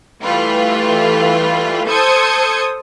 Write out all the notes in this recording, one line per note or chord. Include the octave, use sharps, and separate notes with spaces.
E3 G3 A3 F4 B4
A4 C5 D#6 G#6 C#7